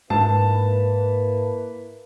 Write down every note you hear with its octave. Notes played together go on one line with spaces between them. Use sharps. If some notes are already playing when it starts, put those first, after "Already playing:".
G#2 A#3 E4 B4 A5